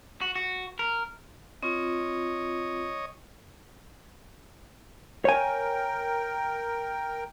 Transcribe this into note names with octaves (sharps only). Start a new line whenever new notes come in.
F#4
F#4
A#4
C4 F4 C#5 D#5
A#4 C#5 G5 G#5